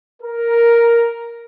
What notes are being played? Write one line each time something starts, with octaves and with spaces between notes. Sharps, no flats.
A#4